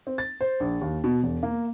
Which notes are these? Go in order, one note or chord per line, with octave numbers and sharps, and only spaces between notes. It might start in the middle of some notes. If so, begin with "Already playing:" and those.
C4
A6
C5
A#1
D#2
B2
E1
A#3